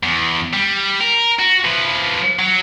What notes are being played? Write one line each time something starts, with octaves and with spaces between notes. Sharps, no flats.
E2
G3
A#4
F#4
F3 B4
F#3